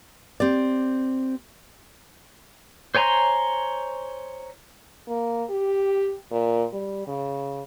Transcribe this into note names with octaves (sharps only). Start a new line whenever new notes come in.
C4 G4 D5
C5 C#5 G#5 A#5 C6
A#3
G4
A#2
G3
C#3